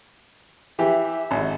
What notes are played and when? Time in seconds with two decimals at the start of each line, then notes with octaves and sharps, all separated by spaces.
0.79 E3 G4 E5
1.31 G#1